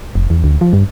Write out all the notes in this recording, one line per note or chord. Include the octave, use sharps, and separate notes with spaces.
F1
E2
D2
F3
G2